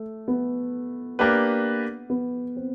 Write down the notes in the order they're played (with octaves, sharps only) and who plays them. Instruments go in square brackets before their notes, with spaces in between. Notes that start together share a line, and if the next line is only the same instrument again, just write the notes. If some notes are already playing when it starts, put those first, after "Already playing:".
Already playing: [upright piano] A3
B3
[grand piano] A#3 D4 G4 B4
[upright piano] B3
C4